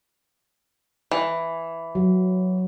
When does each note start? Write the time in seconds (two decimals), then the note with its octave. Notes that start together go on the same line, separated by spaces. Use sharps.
1.11 E3
1.95 F#3